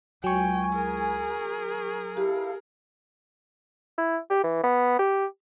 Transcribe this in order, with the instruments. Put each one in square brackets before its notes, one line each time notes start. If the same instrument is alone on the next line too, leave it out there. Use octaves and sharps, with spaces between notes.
[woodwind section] C#2 G#5 [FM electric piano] F#3 C#6 [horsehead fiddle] G5
[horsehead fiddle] G#4 A#4
[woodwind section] E4 A4 F5 [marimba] G4
[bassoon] E4
G4
E3
B3
G4